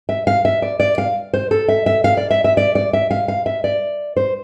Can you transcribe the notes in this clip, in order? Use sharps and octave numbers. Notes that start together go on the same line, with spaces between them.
E5
F5
E5
D5
D5
F5
C5
A4
E5
E5
F5
D5
E5
E5
D5
D5
E5
F5
F5
E5
D5
C5